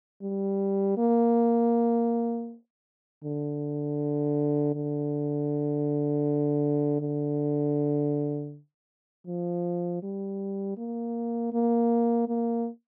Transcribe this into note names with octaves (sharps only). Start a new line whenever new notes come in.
G3
A#3
D3
D3
D3
F3
G3
A#3
A#3
A#3